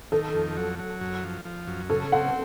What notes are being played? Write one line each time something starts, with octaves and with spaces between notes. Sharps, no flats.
D#3 A4
F2
F#3
F#3
F#2
F3
F3
F#2
C#3 A4
C4 F#5